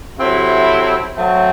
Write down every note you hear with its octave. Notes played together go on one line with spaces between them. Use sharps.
C3 F#3 C4 E4 A4
F#3 A3 C4